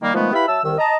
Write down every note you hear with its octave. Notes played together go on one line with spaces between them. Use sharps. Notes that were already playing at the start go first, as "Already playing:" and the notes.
D#3 G3 A#3
D#3 F3 G#3 A3 B3
E4 G4 B4 E5 F5 B5
F#3 E5 A5 E6
C2 D#3 E6
D#5 A5 A#5